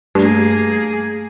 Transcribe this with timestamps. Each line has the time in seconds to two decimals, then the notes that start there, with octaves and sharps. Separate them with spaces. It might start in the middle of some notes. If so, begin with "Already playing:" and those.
0.15 G2 A3 A#3 G#4